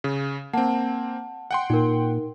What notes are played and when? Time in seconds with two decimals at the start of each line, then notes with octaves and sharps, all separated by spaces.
0.04 C#3
0.53 A#3 C4 F#5 A5
1.51 F#5 G5 C6
1.70 A#2 D#4 A#4